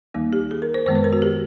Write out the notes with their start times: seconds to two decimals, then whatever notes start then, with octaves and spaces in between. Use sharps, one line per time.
0.14 D#2 D#3 G3 A#3 D#4
0.33 G4
0.51 G#4
0.62 A#4
0.74 C5
0.86 F#2 D#3 G#3 B3 C5
0.95 B4
1.04 A#4
1.13 F#4
1.22 G4